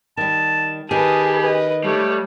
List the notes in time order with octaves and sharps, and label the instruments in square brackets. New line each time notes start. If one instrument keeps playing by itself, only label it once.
[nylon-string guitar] D#3 G3 [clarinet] A5
[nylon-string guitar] D#3 [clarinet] G4 [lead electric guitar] G#4 [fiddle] B4 A5
[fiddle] B4 D#5
[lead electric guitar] G3 [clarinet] A3 [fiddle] A4 C#5